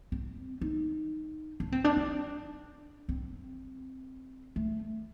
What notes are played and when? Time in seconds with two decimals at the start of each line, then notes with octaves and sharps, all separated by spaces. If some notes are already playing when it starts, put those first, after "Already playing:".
0.12 C4
0.61 D#4
1.60 D4
1.72 C4
1.84 D4
1.97 D4
3.09 C4
4.56 A3